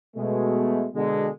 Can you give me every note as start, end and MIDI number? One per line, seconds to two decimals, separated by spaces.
0.16 0.86 47
0.16 0.86 56
0.16 0.86 57
0.95 1.28 47
0.95 1.28 50
0.95 1.28 56